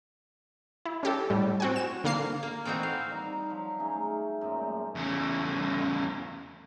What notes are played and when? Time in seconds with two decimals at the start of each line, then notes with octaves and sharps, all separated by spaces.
0.85 E4
1.03 C#4 G4 A4
1.30 A2 G3
1.60 C4 F#4 G#5
1.76 E7
2.04 D3 A#3 F5 C7
2.43 A#3
2.65 E3 A3 C4 D#4 F#4
2.83 F5
3.10 G3 D#4
3.50 F3 F#3
3.79 A3 C#4 D#4 G#4
4.41 F#2 A#2 G#3 A3
4.95 E2 C#3